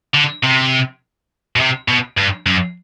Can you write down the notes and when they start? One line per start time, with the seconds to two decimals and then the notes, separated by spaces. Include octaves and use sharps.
0.15 D3
0.44 C3
1.56 B2
1.60 C3
1.88 B2
2.18 G2
2.46 F#2